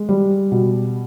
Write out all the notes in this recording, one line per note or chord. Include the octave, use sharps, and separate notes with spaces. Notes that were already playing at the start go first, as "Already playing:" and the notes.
Already playing: G#3
G3
B2